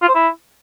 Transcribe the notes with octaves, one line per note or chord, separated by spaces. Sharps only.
F4
C5
E4